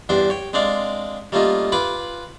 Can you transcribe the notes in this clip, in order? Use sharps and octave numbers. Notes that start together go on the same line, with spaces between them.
E2 G2 D4 C5 G5
C#5 G5
G#3 C4 D4 D5 F5
G3 A3 A#3 C#4 F4 D#5
F4 B4 G#5 B5 D6